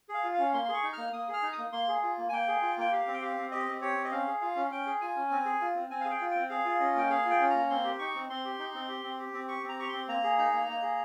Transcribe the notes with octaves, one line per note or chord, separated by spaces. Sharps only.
G#4
F5
F4
F5
C#4
A#3 C6
C6
G#4
C#6
D#4
A#3 F6
A#3 D#6
G#4
F6
D#4
D#6
A#3
A#3 C6
G#4
F4
A#3
G#5
A#3 G5
G#4
F4
A#3 G5
G4 F5
C4
G5
G4 F5
C4
G4 D#5
C4
G4 C#5
C4
D#5
C#4 F5
G#4
F4 F5
C#4
C#4 G5
G#4
F4 G#5
C#4
C4
G#4
F4
C4
C4 G#5
F5
G#4
G5
F4
C4 G5
G#4 F5
F4
C#4 D#5
A#3 G5
G#4 F5
F4
G5
C#4
A#3 A#5
C4 C6
G4
D#4 C#6
C4
C4 C6
G4
D#4
C4
G4
C4
G4
C4
G4 C#6
C4
A#5
G4 C#6
C4 C6
A#3 A#5
G#4
D#4 A#5
A#3
A#3
G#4